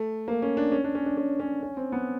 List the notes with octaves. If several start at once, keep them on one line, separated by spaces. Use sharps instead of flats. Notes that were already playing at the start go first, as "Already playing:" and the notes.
Already playing: A3
A#3
C#4
D4
C#4
D4
C#4
D4
C#4
C#4
C#4
C4
B3